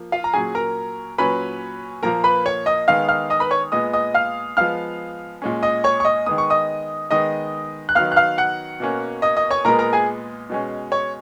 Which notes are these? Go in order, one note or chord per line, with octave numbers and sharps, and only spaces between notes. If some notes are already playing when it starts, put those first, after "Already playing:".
Already playing: F3 A#3
F4 F5
A#5
A#2 F#3 C#4 G#4 G#5
A#4 A#5
A#2 F#3 C#4 B4 B5
A#2 F3 A#3 A#4 A#5
B4 B5
C#5 C#6
D#5 D#6
D#3 G#3 B3 F5 F6
F5 F6
D#5 D#6
B4 B5
C#5 C#6
A#2 G#3 B3 D#5 D#6
D#5 D#6
F5 F6
F3 G#3 B3 F5 F6
A#2 G#3 C#4
D#5 D#6
C#5 C#6
C#6
D#5 D#6
D#3 G#3 B3 D#6
C#6
D#5 D#6
D#3 G#3 B3 D#5 D#6
F#6
D#3 F#3 B3 F5 F6
F#6
F5 F6
F#5 F#6
B2 A#3 C#4
D#5 D#6
D#5 D#6
C#5 C#6
A#2 G#3 B3 A#4 A#5
A#4 A#5
G#4 G#5
B2 G#3 C#4
C#5 C#6